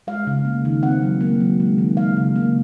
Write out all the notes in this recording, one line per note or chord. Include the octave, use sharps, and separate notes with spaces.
G#3 F5
C#3
A#3
D#3
C4 F#5
F#3
A#3
F#3
G#3
D#3
G#3 F5
C#3
A#3